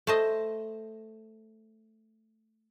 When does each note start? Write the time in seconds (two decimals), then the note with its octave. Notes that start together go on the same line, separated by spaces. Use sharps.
0.07 A3 C5 D#5